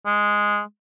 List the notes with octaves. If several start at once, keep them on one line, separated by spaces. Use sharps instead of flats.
G#3